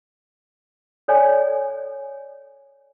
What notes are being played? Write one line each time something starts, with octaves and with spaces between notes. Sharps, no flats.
A4 C#5 D5 G#5